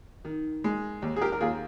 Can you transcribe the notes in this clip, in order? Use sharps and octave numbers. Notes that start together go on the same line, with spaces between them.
D#3
G#3
D#2
G#4
G4 A#4
A#4
D#2 F4 G#4